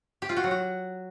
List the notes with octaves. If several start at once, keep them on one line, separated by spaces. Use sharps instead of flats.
G4
F4
F#4
F#3
F#4